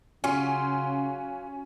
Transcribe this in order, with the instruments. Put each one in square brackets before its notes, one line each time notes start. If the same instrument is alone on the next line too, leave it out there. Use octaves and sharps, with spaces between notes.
[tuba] C#3 [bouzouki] F#3 F4 [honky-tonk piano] C#4